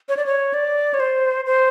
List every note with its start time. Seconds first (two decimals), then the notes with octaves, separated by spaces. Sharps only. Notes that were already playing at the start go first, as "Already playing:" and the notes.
0.09 C#5
0.17 D5
0.26 C#5
0.54 D5
0.94 C#5
1.00 C5
1.46 C5